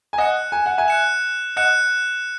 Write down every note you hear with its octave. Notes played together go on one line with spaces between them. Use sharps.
G#5
D#5 F#5 F#6 C#7 E7
G#5
F#5
E5 G#5
F#6 C#7 E7
D#5 F#5 F#6 C#7 E7